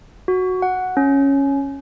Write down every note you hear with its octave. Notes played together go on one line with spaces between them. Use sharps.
F#4
F#5
C#4